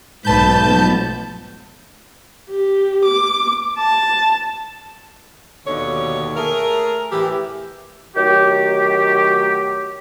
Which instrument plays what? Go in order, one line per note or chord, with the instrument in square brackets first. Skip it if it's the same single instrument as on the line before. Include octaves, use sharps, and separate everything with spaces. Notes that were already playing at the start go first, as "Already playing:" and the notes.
[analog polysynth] B1 A5 G6 [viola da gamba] G#2 A3 B4
[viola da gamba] F3 B3
[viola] G4
D6
A5
[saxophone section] D#2 B2 D3 C#5
A3 G#4 A#4
A2 E3 E4 G4
[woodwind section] D#3 F#3 A3 F#4 G4